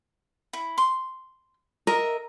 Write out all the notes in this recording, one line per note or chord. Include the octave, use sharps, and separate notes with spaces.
E4
C6
A#4 D#5 E5